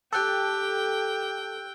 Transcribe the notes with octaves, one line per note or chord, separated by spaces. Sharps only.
G4 A4 G5 E6 F#6